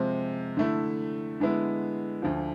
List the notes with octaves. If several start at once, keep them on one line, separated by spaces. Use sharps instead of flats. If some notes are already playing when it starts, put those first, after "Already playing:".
Already playing: C3 F3 G#3 C4
D3 A3 E4
D3 G#3 B3 E4
D2 D3 F3